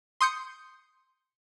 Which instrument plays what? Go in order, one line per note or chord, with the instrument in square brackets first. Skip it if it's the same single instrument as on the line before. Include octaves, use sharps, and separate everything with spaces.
[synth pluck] C6 D#6 G6 C#7